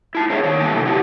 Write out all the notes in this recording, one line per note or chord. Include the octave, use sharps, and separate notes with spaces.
E4 A5
D4 G#4 A#4 C5 C#5 E5
D#3 C#5
E3 G3 A3 A#3 G#5 A5
C3 F#3 E4 G4 A4
F#3 E4 G4 F#5 G#5 A5